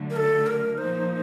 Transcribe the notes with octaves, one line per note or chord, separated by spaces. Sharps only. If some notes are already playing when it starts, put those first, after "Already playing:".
Already playing: D3 F#3 A3
A#4
A4
A#4
A#2 F3 A#3 D#4 C5